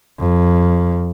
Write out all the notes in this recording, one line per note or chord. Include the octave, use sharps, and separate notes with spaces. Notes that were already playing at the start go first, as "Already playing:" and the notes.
F2